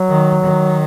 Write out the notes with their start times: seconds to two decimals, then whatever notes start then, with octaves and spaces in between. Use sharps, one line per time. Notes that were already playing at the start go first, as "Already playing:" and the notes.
Already playing: F#3
0.09 D#3
0.43 D#3